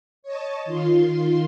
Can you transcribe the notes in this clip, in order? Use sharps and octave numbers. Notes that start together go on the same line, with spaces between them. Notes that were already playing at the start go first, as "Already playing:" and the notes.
C#5 D#5 A5
D#3 F4 C6